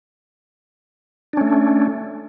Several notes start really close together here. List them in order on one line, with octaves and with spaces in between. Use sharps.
D4 C#4 A3